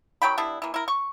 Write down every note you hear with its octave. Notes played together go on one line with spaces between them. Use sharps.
D#3 F#3 G5 B5
G3 B3 D4 E4
E3 A#3
E4 A#4
C#6